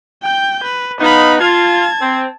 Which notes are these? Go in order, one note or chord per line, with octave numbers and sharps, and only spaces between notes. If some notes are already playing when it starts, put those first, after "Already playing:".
G5 G6
B4
B3 D#4 F5 B5
F4 A5 G#6
C4